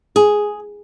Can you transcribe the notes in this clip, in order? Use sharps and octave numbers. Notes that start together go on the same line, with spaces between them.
G#4